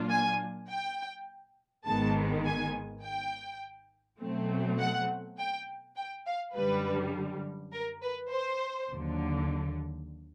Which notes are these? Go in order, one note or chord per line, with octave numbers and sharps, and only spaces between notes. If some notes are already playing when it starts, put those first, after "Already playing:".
Already playing: A#2 F#3 A#3 D4 F4
G#5
G5
G#1 G#2 D#3 G#3 B3 A5
G#5
G5
B2 F#3 A3 C4
F#5
G5
G5
F5
F#2 D3 G3 B4
A#4
B4
C5
D#2 D3 F#3